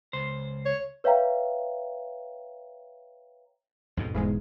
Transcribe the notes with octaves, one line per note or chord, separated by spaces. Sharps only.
C#2 C5
C#5
B4 C#5 E5 F5 G5 A#5
F2 G#2 B2
E1 E2 G#2 G#3